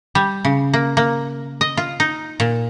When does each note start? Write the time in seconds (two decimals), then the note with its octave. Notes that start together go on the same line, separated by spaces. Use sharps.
0.15 G3
0.45 C#3
0.73 A#3
0.97 A#3
1.61 D#5
1.77 F4
2.00 D#4
2.40 A#2